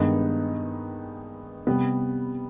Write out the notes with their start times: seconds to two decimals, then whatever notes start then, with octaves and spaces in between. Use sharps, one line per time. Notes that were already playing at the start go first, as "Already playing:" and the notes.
Already playing: G2 D#3 G#3 B3 D#4
1.67 C3 G3 B3